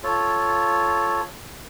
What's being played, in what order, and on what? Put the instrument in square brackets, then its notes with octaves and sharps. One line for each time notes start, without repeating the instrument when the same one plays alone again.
[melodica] F4 A4 C#5